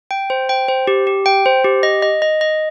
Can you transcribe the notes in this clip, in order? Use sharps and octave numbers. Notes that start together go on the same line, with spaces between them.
G5
C5
G5
C5
G4
G4
G5
C5
G4
D#5
D#5
D#5
D#5